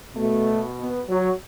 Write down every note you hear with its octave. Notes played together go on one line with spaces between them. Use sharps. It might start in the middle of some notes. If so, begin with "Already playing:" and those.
B2 A3
B3
F#3